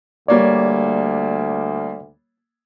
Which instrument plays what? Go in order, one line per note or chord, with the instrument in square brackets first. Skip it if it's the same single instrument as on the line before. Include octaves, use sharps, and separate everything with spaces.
[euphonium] D2 [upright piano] G3 A#3 C#5 [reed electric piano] D5